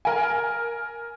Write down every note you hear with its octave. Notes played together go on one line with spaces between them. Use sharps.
A#4 G#5